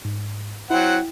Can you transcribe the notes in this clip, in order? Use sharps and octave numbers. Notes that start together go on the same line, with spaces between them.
G#2
F#3 C4 E4 F#5 G5